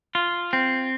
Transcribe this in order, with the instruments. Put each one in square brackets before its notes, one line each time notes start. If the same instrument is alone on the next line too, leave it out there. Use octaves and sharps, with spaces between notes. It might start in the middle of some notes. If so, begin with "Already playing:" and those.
[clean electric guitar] F4
C4